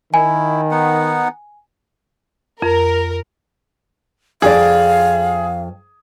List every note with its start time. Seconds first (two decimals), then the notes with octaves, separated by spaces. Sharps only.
0.14 D#3 E4 G#5
0.71 B3 D#4 F#5
2.62 F2 A#4
4.42 F2 G#4 D5 F5